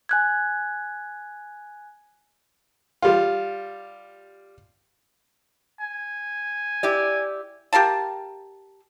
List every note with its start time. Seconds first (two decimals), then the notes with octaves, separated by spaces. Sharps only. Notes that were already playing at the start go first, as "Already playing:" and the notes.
0.09 G#5 F#6 G#6
3.02 G3 F4
5.80 G#5
6.83 E4 G4 D5
7.73 G4 A#4 F5 A5